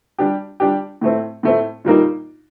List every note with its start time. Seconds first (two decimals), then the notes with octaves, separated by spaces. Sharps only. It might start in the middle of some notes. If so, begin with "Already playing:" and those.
0.19 G3 D4 G4
0.60 G3 D4 G4
1.01 A2 A3 C4
1.43 A2 A3 C4
1.85 A#2 G3 A#3 D#4